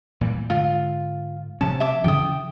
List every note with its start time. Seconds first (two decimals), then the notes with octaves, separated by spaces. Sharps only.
0.21 A#2 E3 G3
0.50 G#2 D3 F4
1.61 C3 F3 C#4 A5
1.80 E5 D6
2.04 C#3 E3 F3 G5 D#6